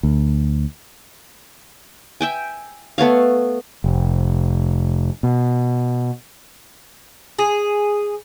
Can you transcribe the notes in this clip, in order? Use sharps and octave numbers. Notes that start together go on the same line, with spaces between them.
D2
E5 G5 G#5
A3 B3 C#5 F5
F1
B2
G#4